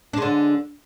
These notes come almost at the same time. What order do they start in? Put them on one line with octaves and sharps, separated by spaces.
D4 G#3 D3